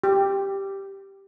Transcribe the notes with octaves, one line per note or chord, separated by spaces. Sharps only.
G4